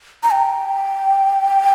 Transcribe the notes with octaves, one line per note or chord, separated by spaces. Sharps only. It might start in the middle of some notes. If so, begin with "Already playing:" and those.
A#5
G5